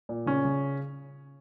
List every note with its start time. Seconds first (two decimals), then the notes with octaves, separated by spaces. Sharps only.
0.09 A#2
0.26 C#3 C#4
0.45 C#3